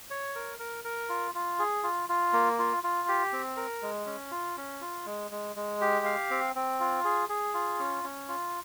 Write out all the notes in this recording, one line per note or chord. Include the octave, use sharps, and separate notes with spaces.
C#5
A#4
A#4
A#4
F4
F4
G#4
F4
F4
A#3
F4
F4
G4
C4
A#4
G#3
C#4
F4
C#4
F4
G#3
G#3
G#3
G4
F5
C4
C4
F4
G#4
G#4
F4
C#4
C#4
F4